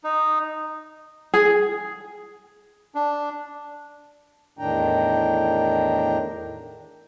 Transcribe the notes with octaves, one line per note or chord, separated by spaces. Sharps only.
D#4
G#4
D4
E2 A2 D#3 D4 G5 A#5